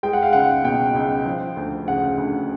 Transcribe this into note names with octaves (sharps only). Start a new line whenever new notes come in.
G#3 G5
F#5
F5
C#2 F#5
B2 G5
C#2
F3
D2
C#3 F#5
D2